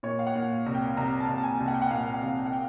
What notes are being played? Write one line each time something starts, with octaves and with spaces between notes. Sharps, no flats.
A#2 C#5
F5
F#5
A#2
C2
G5
C2 A#5
A5
C2
A5
G#5
C2
F#5
G5
F#5
A#2 F5
F#5
C2
G5
F#5
G5